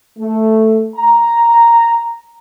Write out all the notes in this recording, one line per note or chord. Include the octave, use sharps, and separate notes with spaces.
A3
A#5